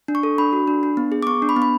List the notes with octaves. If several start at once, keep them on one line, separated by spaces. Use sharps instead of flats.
D4
C#6
A4
D4 B5
F#4
D4
D4
B3
G#4
D6
B3 C#6
D4
B5
B3
B5